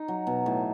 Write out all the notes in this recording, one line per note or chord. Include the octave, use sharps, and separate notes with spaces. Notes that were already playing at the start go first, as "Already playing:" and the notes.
Already playing: D#4
F#3
B2
A2